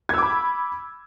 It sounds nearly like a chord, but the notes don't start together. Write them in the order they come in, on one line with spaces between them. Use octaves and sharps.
G#6 E6 D6 B5